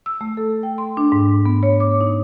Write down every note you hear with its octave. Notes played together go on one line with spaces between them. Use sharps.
E6
A3
A4
G5
C6
D4
G#2
B3
C#5
D6
D#4